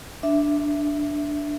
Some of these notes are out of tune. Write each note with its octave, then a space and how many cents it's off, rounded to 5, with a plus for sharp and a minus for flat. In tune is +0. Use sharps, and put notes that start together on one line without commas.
D4 +0 E5 +0